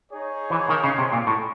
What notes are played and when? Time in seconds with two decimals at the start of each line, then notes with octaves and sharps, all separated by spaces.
0.12 D#4 G#4 C#5
0.50 E3
0.69 D#3
0.84 C#3
0.98 C3
1.13 A#2
1.27 A2